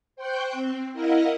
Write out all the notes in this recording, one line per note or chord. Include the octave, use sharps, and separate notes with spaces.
C5 G5 C6 C#6 F#6 G6
C4
E4 A#4 D#5 F5 F#5 A#5